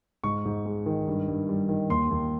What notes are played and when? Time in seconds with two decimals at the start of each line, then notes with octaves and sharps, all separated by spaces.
0.23 G#2 C#6
0.45 G#2
0.66 G#3
0.86 D#3
1.07 G2
1.28 G2
1.49 G3
1.69 D#3
1.89 D#2 C6
2.11 D#2